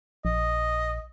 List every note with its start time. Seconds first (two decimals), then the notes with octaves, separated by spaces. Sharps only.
0.25 A#1 D#5